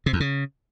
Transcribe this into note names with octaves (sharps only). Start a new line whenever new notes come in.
C3
E2
C#3